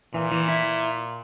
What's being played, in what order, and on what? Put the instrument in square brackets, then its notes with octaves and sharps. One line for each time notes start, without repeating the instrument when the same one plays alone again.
[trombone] A#2 [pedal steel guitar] E3
[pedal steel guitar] E3
E4